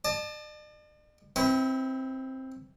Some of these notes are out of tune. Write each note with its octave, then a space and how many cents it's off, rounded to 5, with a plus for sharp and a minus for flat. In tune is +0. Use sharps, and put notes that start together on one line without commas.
D5 +45 A5 -10
C4 +10 E4 -35 B4 +10